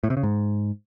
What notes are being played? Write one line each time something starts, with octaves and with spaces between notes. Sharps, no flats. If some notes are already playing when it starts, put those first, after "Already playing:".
A2
C3
C#3
G#2